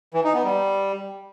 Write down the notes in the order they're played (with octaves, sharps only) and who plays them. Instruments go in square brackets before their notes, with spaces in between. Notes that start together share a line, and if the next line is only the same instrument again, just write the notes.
[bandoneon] E3
D#4
B3
G3